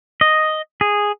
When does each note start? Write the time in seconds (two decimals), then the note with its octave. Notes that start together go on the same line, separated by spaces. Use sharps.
0.21 D#5
0.81 G#4